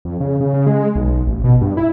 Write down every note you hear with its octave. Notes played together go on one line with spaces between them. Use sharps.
F2
C#3
C#3
C#3
G#3
B1
A1
B2
G2
E4